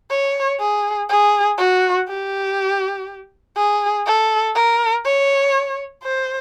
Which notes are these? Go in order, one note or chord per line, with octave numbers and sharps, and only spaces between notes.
C#5
G#4
G#4
F#4
G4
G#4
A4
A#4
C#5
C5